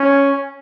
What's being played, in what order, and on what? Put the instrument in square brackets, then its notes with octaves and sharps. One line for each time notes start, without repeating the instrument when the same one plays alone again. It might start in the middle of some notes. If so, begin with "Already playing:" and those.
Already playing: [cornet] C#4